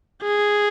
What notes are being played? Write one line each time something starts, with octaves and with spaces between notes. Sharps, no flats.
G#4